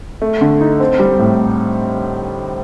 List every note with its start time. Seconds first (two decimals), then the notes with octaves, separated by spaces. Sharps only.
0.22 A3
0.41 D3
0.61 D#4
0.80 C4
1.00 G3
1.19 A2